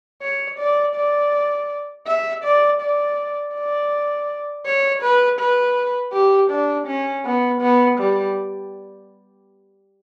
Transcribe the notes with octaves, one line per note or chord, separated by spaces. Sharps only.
C#5
D5
D5
E5
D5
D5
D5
C#5
B4
B4
G4
D4
C#4
B3
B3
G3